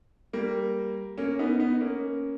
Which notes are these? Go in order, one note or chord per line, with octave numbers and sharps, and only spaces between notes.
G3 A#3
A#3 C#4
B3 D#4
B3 D#4
A#3 C#4